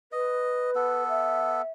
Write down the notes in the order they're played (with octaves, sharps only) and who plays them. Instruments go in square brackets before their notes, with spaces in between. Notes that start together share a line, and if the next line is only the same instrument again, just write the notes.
[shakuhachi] B4 [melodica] D#5
[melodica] B3 A4
[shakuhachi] E5